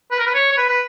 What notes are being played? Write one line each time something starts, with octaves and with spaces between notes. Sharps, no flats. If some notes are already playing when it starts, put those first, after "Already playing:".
B4
A#4
B4
C#5
C#5
B4
B4